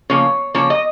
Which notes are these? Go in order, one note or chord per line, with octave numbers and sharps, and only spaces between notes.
C#3 F3 A#3 C#5
C#3 F3 A#3 C#5
D#5